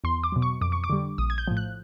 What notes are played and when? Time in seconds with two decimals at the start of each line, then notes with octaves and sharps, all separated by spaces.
0.04 E2 C6
0.24 D6
0.32 B2 F#3
0.42 C#6
0.61 F2 D6
0.72 C#6
0.84 D6
0.90 D3 G3
1.18 A#1 D#6
1.30 G#6
1.38 G6
1.48 A2 F3
1.57 F#6